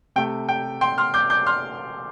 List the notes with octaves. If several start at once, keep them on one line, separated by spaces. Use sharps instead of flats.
C3 A3 G5
G5
G5 C6
C6 F6
D6 G6
D6 G6
C6 F6